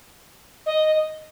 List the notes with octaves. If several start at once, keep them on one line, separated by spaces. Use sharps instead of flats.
D#5